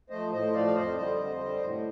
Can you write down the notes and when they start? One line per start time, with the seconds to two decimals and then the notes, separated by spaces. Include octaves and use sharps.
0.10 F3 A3 C5 D#5
0.32 A2 C5 D#5
0.53 F3 A3 D5 F5
0.65 F5
0.75 F2 C5 D#5
0.97 D3 G3 C5 D#5
1.19 F2
1.40 D3 G3
1.62 A2